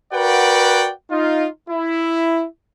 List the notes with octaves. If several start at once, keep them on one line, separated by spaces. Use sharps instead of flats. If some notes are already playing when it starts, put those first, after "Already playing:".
F#4 A#4 B4 D5 F#5 G5
D#4 F4
E4